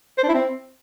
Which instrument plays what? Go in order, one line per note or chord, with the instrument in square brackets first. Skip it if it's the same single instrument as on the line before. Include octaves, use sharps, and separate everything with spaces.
[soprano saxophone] C5
D4
E4
C4